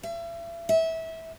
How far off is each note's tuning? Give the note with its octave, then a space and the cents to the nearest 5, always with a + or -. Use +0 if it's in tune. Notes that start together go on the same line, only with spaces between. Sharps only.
E5 +40
E5 -20